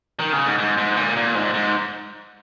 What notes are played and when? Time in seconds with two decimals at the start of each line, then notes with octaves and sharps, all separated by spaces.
0.20 D#3
0.33 C#3
0.46 G#2
0.59 G#2
0.78 G#2
0.97 A#2
1.16 A#2
1.35 G#2
1.54 G#2